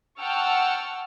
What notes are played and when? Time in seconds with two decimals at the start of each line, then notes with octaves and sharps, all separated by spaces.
0.20 F#5 G5 A5 C#6 E6 F6